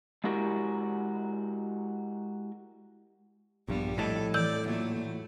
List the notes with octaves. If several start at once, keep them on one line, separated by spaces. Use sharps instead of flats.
G#3 E4 F#4 G4 A#4
A#1 G2 G3 B3
F2 A2 A4 D#5 A5
E3 A4 D5 G6
E2 A#2 F#3 A3